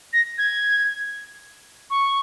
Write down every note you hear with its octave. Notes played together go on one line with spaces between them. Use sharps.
A#6
G#6
C#6